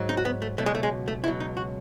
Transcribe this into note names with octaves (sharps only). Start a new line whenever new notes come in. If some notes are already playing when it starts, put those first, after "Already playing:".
Already playing: G#2 F#3
D#4
F#4
B3
A3
C#2 B2 F#3 A3
G#3
A3
G#3
A3
C#2 B2 F#3 E4
D#4
F#4